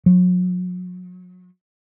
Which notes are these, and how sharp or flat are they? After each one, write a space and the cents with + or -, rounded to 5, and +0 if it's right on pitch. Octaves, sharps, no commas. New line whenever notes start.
F#3 -35